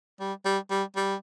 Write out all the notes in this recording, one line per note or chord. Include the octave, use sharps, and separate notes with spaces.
G3
G3
G3
G3